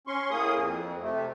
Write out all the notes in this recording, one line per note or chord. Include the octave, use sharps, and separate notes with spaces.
C#4 C6 C#6
A2 A#3 G#4 D#6
F2
C3 A3